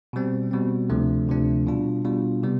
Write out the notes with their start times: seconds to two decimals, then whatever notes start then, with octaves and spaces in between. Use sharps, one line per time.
0.13 B2 G3 C4
0.51 B2 G3 C4
0.90 D2 C3 F3 A3 D4
1.28 D2 C3 F3 A3 D4
1.67 B2 G3 D4 F4
2.05 B2 G3 D4 F4
2.43 C3 G3 B3